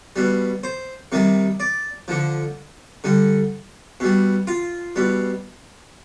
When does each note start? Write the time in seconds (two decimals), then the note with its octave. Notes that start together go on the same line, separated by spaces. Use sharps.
0.16 B2 G3
0.64 C5
1.12 C3 D#3 G3
1.60 D5
2.08 D3 F3
3.04 D3 G3
4.00 B2 G3
4.47 F4
4.96 B2 G3